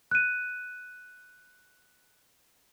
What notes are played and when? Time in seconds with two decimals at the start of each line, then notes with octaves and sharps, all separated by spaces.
0.11 F#6 D#7